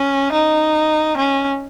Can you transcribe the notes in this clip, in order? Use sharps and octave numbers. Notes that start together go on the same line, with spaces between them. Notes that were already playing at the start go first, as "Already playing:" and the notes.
Already playing: C#4
D#4
C#4